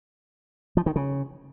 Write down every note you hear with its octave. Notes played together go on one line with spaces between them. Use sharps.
F3
D#3
C#3